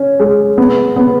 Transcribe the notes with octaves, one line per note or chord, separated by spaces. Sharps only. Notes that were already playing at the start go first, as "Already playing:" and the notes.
Already playing: C#4
G#3
B3
B3